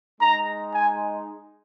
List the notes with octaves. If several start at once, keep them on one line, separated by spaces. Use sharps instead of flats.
G#3 D#4 A#5
G#5